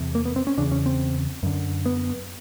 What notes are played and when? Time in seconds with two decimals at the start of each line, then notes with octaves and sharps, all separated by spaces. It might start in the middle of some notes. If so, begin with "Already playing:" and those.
Already playing: E2 C3
0.15 A#3
0.25 B3
0.36 C4
0.47 C#4
0.58 E2 C#3 D4
0.72 C#4
0.86 C4
1.43 F#2 D3
1.86 B3